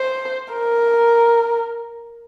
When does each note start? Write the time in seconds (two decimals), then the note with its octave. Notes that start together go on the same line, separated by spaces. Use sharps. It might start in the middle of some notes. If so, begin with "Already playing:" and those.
Already playing: C5
0.53 A#4